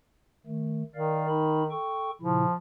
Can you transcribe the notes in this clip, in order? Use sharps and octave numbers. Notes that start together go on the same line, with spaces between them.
D#3 A3
D#3 A#4 D5 F5
D#4 B5
A4 G5 C#6
A#2 C#3 F3 E4